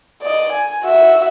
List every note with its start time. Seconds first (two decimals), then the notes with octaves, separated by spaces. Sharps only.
0.22 D5 D#5
0.52 G#5
0.84 F#4 E5